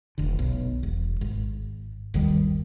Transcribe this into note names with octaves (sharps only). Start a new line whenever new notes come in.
F1 D3
B1
E1
G#1
G1 D#2 D#3 G3